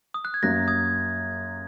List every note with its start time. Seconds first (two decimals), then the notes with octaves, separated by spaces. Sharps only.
0.14 D#6
0.25 F#6
0.34 G#6
0.43 F#2 F#3 A#3 F#6 A#6
0.68 D#6 G#6